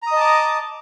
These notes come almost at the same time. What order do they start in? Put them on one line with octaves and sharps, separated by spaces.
A#5 D#6 D#5 A5 D6